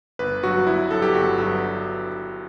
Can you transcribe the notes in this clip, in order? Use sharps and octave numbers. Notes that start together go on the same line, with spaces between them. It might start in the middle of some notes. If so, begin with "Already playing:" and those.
G1 B4
G2 F#3 F#4
G1 E4
G2 F#3 A4
G4
G1 F#4
G2 F#3 F#4